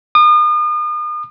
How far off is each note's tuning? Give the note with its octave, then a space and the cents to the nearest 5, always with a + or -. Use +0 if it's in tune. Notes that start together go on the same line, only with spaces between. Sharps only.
D#6 -40